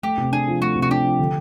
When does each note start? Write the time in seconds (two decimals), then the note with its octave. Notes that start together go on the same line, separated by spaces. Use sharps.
0.03 A3 G4
0.17 C3
0.32 D4 G#4
0.47 F3
0.61 A3 F#4
0.75 C3
0.82 F#4
0.90 D4 G4
1.04 F3
1.19 D3